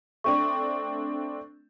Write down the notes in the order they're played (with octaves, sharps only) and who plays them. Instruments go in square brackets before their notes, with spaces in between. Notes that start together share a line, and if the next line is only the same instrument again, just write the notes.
[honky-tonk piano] A3 C4 D4 [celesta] C#6